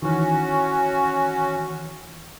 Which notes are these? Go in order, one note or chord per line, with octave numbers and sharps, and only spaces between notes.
D#3 E3 C#4 F#4